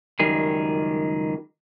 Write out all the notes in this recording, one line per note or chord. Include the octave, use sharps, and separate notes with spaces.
C#2 F#2 D#3 G3 G#4